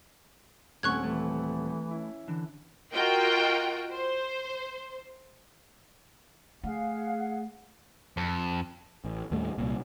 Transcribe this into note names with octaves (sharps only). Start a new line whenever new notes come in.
D#1 A3 C4 C#4 F#5 C#6 F#6 G#6
E3 A3
C#4 E4
D3 E3
F4 F#4 A#4 D#5 G5
C5
A3 G#4 F5 F#5
F2
A1
D#2 A2 G3 A3
C2 A#2